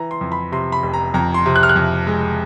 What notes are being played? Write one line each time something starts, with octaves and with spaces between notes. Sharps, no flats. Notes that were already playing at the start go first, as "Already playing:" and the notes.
Already playing: E3 A#5
C6
F2
B5
C3 C6
B5
F1
A#5
F2 A#5
C6
C3
F#6
F6
F#6
F2
G#3